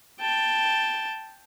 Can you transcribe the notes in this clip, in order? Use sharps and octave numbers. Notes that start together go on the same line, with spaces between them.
G5 A5